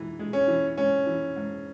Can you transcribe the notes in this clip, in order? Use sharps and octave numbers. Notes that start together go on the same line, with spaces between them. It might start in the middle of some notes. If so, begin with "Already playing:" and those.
Already playing: G#2 E3
G#3
C#4
E3
G#2 C#4
E3
G#2